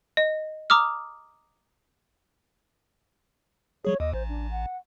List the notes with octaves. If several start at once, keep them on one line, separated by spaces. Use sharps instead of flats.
D#5
A#5 D6 D#6 F6
F#3 G3 G#4 C#5
D#2 D#5
A1 C5
D4
F#5